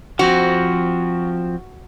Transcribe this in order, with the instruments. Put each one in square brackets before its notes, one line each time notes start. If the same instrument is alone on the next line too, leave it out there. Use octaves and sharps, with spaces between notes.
[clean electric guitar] F3 C4 [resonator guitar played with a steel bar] F#4